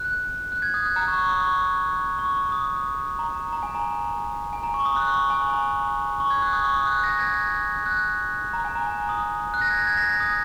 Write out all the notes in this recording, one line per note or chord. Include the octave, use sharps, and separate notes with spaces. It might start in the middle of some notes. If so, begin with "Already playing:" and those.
Already playing: F#6
F#6
G#6
D#6
F#6
A#5
C#6
C#6
D#6
C#6
C#6
D#6
A#5
A#5
G#5
A#5
G#5
A#5
C#6
D#6
F#6
C#6
G#5
G#5
A#5
C#6
G#6
F#6
D#6
C#6
D#6
F#6
A#6
G#6
F#6
A#5
G#5
A#5
G#5
D#6
F#6
A#6
G#6
F#6
G#6
A#6
G#6
D#6